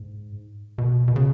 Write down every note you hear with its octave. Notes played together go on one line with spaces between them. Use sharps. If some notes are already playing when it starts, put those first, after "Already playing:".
Already playing: G#2
B2
B2
C#3